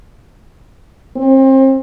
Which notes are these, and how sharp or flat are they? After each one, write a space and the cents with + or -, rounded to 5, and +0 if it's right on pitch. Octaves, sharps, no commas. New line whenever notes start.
C4 +35